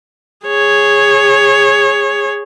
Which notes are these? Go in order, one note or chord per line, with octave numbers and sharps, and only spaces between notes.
G#4 C#5